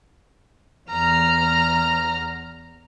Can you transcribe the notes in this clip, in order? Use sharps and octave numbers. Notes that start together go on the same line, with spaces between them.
E2 A#5 F6